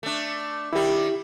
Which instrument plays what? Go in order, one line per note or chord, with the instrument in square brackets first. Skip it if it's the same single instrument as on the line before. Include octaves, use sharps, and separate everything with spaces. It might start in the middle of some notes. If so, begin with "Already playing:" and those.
[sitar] A3 D4
[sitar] D#3 G3 [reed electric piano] E4 G4